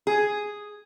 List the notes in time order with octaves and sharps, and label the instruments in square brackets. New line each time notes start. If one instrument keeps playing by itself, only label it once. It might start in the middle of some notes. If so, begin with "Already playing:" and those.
[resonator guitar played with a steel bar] G#4